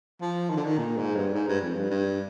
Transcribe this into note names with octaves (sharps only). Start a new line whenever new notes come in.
F3
D#3
D3
D#3
A#2
G#2
G2
G#2
G2
F2
G2
G2